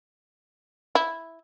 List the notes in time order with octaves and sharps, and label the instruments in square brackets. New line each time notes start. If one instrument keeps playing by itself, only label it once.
[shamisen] E4